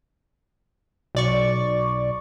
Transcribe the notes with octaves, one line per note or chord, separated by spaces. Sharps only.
B1 D5 C#6